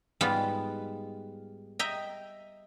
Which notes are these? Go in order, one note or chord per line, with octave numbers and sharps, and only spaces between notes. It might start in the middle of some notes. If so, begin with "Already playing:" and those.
G#2 G3 G#3 B3 F4
D#5 E5 G5 A#5